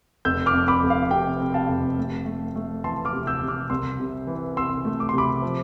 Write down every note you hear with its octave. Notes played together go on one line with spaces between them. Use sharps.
F1 E6 G6
D6 F6
F2
B5 D6
F1
F5
C3 G5
C3
F5 A5
F1
A3
A3
A3
E3 A5 C6
D6 F6
C3
E6 G6
C3
D6 F6
C2 C6 E6
C3
E3
C3 C6 E6
A3
D6
C6
C3 B5 D6
F3